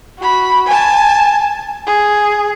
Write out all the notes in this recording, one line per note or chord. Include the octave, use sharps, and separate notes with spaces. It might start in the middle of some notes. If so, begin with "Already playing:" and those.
F#4 B5
G#5 A5
G#4